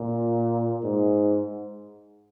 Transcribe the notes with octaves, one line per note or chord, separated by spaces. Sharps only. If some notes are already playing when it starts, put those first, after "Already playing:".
Already playing: A#2
G#2